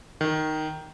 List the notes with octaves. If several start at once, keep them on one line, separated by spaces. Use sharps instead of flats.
D#3